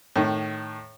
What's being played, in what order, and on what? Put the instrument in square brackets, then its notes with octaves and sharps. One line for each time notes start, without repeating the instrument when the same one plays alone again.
[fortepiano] A2 D#3